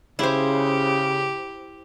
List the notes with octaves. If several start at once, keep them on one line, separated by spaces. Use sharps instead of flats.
C#3 E4 G4 C5